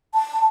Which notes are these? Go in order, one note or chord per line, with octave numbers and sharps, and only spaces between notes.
A5